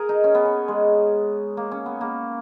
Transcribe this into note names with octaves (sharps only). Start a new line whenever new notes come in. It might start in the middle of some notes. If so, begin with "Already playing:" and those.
Already playing: G#4 A#4
D#4
C#4
B3
C#4
G#3
A#3
C#4
B3
A#3